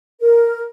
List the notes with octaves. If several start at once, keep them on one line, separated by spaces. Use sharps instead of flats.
A#4